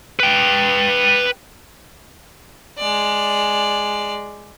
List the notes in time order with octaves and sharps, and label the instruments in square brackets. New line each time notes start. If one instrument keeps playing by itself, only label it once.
[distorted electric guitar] B4 G5
[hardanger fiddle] G#3 D5